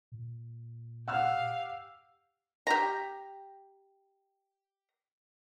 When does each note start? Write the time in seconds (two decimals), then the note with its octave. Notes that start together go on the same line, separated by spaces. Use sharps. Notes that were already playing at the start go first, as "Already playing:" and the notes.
0.12 A#2
1.08 G4 F5 F#5 E6 F6
2.67 G4 A#5